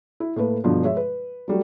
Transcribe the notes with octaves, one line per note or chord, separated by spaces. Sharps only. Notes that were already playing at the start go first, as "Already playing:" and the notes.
E4
A2 A#3 A4 B4
G2 B2 D3 F3 F#3
G#3 C#5 E5
B4
F#3 G3 A3